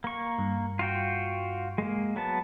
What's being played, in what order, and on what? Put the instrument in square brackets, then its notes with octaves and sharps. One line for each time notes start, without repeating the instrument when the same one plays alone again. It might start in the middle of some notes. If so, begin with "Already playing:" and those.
[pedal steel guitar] A#3 C#6
[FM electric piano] G2
[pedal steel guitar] F4 F#4 G5
G#3 A#3
F#3 B3 A5